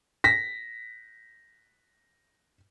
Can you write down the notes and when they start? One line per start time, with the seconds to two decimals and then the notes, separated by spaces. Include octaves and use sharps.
0.24 A#6 B6